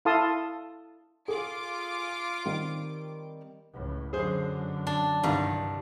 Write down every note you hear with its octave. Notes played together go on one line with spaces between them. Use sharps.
E4 A4 F5 A5 C6 D#6
F4 G#4 A4 D6 D7
D#3 G3 C4
C#2 A2
F#2 D3 G#4 C5
D4
C2 G2 D#3 A#5